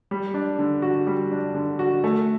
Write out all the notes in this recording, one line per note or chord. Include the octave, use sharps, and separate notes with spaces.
G3
D4
D3
F#4
G3
D4
D3
F#4
A3